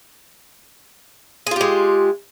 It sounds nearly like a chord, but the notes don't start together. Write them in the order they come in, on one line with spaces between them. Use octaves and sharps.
G#4 F4 G4 G#3